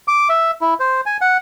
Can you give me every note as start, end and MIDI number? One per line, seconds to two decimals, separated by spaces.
0.08 0.28 86
0.29 0.51 76
0.61 0.74 64
0.80 1.01 72
1.06 1.17 80
1.21 1.37 78